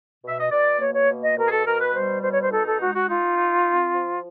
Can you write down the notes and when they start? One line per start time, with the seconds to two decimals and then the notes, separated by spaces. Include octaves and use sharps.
0.23 B2 E5
0.39 D#5
0.50 B2 D5
0.79 A#3 C#5
0.93 C#5
1.09 B2
1.22 D#5
1.37 B2 A#4
1.46 G#4
1.51 A4
1.65 B2 A#4
1.79 B4
1.93 G3 C5
2.22 B2 C5
2.32 C#5
2.41 C5
2.50 D#4 A4
2.66 A4
2.79 G#3 F#4
2.94 F#4
3.08 D#4 F4
3.36 D#4
3.65 C4
3.93 F3